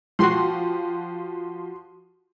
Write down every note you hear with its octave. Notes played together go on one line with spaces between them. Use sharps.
F3 F#4 G4 C6